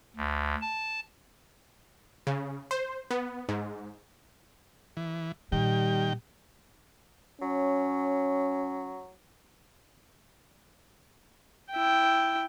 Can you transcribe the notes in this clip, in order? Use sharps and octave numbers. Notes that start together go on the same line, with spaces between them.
D2
A5
C#3
C5
B3
G#2
E3
A#2 D#3 G3 G5
F#3 C#4
E4 G5